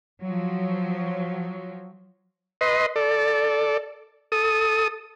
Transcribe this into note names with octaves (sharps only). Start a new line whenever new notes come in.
F3 F#3
B4 D#5 C6
A4 D5
A4 D#6